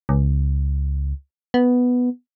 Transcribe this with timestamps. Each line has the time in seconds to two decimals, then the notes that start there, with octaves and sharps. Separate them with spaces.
0.09 C#2
1.54 B3